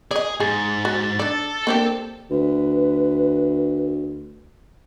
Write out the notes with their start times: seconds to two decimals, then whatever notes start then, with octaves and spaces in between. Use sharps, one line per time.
0.11 G#4 D5 D#5
0.40 G#2 G#4 A6
0.85 F#4
1.19 D4 A4 D5
1.67 D3 A#3 C4 G4
2.31 D2 B4